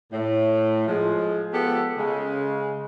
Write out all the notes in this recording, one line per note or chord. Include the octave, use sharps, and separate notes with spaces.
A2
F3 G#3
B3 F4 G4 A4
C#3 G#3